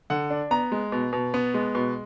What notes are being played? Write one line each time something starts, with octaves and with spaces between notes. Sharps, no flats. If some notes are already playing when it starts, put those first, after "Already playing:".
D3 F#5
D4
B3 A#5
G#3
B2
B2
B3
G#3
B2